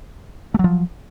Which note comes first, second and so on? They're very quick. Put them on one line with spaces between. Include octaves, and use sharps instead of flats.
A3 F#3 F3